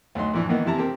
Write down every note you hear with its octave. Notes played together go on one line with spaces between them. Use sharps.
D2 F#3 D#4 C6
A1 F2 E3 D4
D#3 E3 A#3 B3 D#4
E2 C3 E4 A5 A#5
C4 G4 A#4